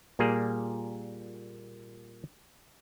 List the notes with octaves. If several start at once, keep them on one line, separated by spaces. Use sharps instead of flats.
A#2 G3 A#3 G#4